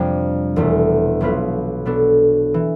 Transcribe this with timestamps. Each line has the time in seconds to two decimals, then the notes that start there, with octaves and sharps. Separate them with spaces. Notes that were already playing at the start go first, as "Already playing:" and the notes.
Already playing: F2 C3 G3 D4
0.56 E1 E2 B2 A3
1.21 B1 B2 B3 F4 B4
1.86 B2 B3 D4 A4
2.54 E3